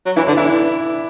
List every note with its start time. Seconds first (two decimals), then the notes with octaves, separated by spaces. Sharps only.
0.06 F#3
0.16 E3 E4
0.27 D3 D4
0.37 E3 E4